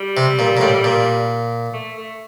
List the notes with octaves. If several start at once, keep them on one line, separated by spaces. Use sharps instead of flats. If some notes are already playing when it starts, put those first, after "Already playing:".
Already playing: G3
C3
A#2
A#2
A2
A#2
A3
A3